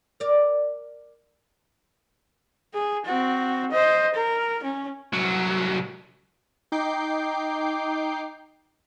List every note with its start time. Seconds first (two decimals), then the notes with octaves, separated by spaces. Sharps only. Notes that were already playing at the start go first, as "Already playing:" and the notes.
0.20 A#4 D5
2.74 G#4
3.06 C4 F#4
3.72 C5 D#5
4.14 A#4
4.63 C#4
5.13 C2 F#3
6.72 D#4 G5 D6 G6 C7